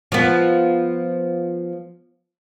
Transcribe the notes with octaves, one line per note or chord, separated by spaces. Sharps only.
F3 B3